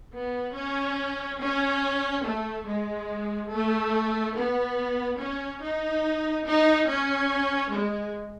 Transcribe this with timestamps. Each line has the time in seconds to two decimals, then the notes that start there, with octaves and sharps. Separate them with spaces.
0.12 B3
0.54 C#4
1.39 C#4
2.23 A3
2.65 G#3
3.49 A3
4.34 B3
5.19 C#4
5.61 D#4
6.45 D#4
6.87 C#4
7.72 G#3